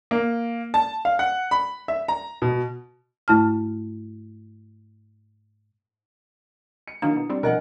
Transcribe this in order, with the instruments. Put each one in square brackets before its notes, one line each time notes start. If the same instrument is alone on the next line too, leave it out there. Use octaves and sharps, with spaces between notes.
[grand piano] A#3
A5
F5
F#5
B5
E5
A#5
B2
[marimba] G#2 A3 E4 A5 F6
[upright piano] C#7
[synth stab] D#3 F#3 A#3 [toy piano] D4 E4 [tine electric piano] D#6
[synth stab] B2
G3 C4
[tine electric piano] B2 F3 [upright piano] A#4 F#5 [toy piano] C5 D#5 G#5